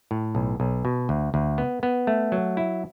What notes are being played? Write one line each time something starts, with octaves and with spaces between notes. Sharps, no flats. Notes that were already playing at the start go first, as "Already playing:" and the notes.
A2
B1
B1
B2
D2
D2
B3
B3
A3
F#3
E4